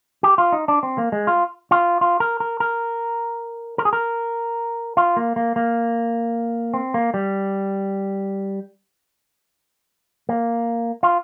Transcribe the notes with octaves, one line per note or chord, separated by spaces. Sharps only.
G4
F4
D#4
D4
C4
A#3
G#3
F4
F4
F4
A#4
A#4
A#4
A#4
G#4
A#4
F4
A#3
A#3
A#3
C4
A#3
G3
A#3
F4